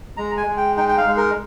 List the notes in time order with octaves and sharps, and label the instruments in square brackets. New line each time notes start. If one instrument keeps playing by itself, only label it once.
[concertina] G#3 A#5
G#5
G#3
G5
D#4 G5
G5
F5
G#3
A#4